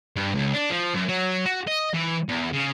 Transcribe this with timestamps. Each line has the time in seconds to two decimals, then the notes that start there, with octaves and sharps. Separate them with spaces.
0.16 G2
0.34 C#2
0.53 D4
0.70 F3
0.95 F#2
1.09 F#3
1.46 F#4
1.67 D#5
1.94 E3
2.29 E2
2.53 C#3